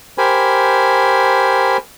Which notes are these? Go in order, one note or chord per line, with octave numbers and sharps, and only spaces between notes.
G4 A#4 C5 G#5 B5